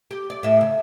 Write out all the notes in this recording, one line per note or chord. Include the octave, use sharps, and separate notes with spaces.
G4
D5
A2 E5
C#3